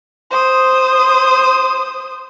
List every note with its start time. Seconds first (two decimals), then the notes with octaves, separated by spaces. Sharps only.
0.31 C5 D#6